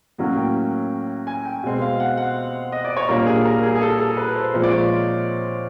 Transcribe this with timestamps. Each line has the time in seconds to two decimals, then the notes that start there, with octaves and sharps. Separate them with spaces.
0.18 A2 F#3 A#3 C#4
0.36 G5
1.27 G#5
1.45 G5
1.63 B2 G#3 C4
1.82 F5
2.00 F#5
2.17 F#5
2.72 D#5
2.85 D5
2.97 C#5
3.09 A#2 G3 A#3 D4 A#4
3.27 G#4
3.45 A#4
3.63 G#4
3.75 G#4
3.82 A4
3.99 A4
4.17 B4
4.36 C5
4.54 A#2 F3 G#3 C4 C5
4.63 D5
4.72 C#5